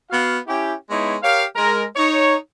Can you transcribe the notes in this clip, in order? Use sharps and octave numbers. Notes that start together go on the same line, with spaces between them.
B3 F#4 F5
C#4 E4 G4
G#3 B3 D#4 E4 C#5
G4 A#4 C#5 F5
G#3 A#4
D#4 C#5